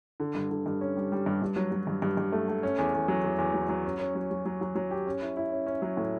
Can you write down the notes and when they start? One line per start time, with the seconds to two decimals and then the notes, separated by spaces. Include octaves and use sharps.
0.20 D3
0.35 G2
0.51 D3
0.66 G2
0.81 C#4
0.97 G3
1.12 G3
1.26 G2
1.42 G2
1.56 F#3
1.72 F#3
1.87 G2
2.02 G2
2.17 G2
2.32 A3
2.48 A3
2.63 C#4
2.78 E2
2.93 E2
3.08 F#3
3.24 E2
3.38 E2
3.54 F#3
3.69 F#3
3.85 C#4
3.99 C#4
4.15 F#3
4.31 F#3
4.45 F#3
4.61 F#3
4.75 F#3
4.91 G4
5.07 C#4
5.22 E4
5.37 E4
5.52 C#4
5.66 C#4
5.82 F#3
5.97 A2